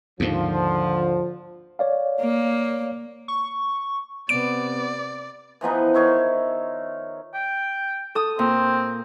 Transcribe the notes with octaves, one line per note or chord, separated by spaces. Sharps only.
D#2 G#2 D3 F3
C#5 D5 F5
A#3
C#6
C3 B3 D5 D7
E3 F3 B3 D#4
D#3 C#5 E5 C6
G5
A4 D#6
A#2 C4